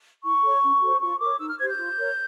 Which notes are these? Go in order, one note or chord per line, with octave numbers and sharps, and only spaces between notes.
E4 C#6
A4 C#5
C#4
F#4 A4 C5
F4 C#6
A#4 C#5 D6
D#4 E6
F6
G4 C5 G#6
G6
F4
A#4 C#5